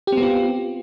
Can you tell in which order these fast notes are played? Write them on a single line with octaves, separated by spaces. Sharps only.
G4 C4 B3 F4